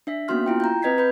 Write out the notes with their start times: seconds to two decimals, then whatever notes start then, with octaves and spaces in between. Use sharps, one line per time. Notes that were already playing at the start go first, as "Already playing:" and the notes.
0.07 D4 E5 B6
0.28 A#3 B3 C#4 F#4 C6 F6
0.46 E4 F4 G5
0.60 A#5 G6
0.82 C4 B4 D#5 G#6 B6 C7
0.98 B4 B5 G6